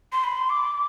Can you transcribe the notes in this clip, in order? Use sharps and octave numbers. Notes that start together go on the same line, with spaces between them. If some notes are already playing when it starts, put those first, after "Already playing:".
C6
B5
C6
D6